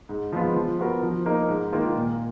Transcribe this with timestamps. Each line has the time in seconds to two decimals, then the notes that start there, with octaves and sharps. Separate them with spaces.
0.09 G#2
0.33 F3 G#3 B3 F4
0.56 F3
0.79 B3 F#4 A#4
1.03 F3
1.26 A#3 D#4 A#4
1.49 G#2
1.72 D#3 A#3 F4 A#4
1.95 A#2